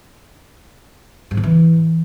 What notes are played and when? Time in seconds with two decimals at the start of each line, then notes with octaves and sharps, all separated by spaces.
1.31 G#2
1.37 C3
1.43 E3